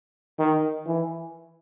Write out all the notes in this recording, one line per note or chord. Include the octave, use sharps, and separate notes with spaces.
D#3
E3